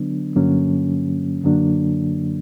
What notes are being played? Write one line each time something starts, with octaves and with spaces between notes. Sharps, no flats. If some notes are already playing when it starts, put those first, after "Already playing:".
Already playing: D3 F#3 B3 D4
G2 D3 F#3 A#3 C#4
F#2 D3 F#3 A#3 D4